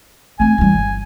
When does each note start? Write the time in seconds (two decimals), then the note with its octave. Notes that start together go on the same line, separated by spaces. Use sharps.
0.40 A3 C4 G#5
0.58 E3 G3
0.75 G1